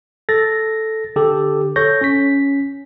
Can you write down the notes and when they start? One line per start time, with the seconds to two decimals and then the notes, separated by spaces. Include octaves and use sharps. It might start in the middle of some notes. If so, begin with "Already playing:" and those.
0.29 A4 A6 A#6
1.16 D3 G4 A4
1.76 A4 C#5 C#6 G6 A#6
2.01 C#4 B6